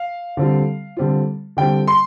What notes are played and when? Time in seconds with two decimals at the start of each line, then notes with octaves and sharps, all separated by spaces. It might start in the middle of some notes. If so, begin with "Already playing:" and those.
Already playing: F5
0.37 D3 G3 C4 F4
0.97 D3 G3 C4 F4
1.57 D3 G3 C4 F4 G5
1.88 C6